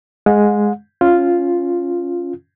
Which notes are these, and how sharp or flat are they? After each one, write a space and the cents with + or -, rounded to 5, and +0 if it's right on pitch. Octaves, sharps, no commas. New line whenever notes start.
G#3 +0 F#5 -45
C#4 +0 F4 +0